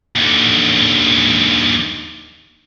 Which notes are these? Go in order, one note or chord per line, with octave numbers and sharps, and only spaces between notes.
D#2 D3